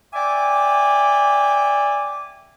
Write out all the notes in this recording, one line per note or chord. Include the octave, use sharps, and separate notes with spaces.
D5 E5 G5 G#5 D6